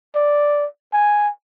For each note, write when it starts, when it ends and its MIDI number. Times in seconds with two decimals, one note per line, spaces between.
0.15 0.66 74
0.93 1.29 80